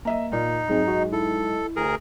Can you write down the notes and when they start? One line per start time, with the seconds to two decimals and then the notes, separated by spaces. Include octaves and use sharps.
0.05 A#3 D#5 E5 A#5
0.32 A#2 D#4 D5
0.68 G#2 F#3 G#3 C4 G#4 A#5
0.88 F#4 D#5
1.13 E4 A4
1.76 D2 G#4 A#4